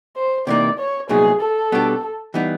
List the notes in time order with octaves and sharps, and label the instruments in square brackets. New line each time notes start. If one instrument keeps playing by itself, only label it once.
[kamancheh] C5
[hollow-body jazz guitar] C3 E3 G3 A#3 D#4 [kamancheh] D5
[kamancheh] C#5
[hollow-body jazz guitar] C2 A#2 F#3 B3 D#4 [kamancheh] G#4
[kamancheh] A4
[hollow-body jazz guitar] B2 G3 B3 D4 G4
E3 G3 B3 D#4